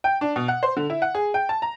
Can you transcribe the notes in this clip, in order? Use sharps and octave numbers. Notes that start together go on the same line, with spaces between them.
G5
D4
B2
F#5
C5
D3
E4
F#5
G#4
G5
A5
A#5